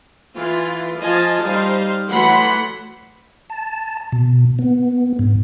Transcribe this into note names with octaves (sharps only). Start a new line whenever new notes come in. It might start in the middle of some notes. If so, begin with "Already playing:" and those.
E3 F4
F3 F4 D#5 G#5 A5
G3 D#4 C5 F5
E3 F#3 A3 F#5 B5 C6
A5
B2
B3
G#2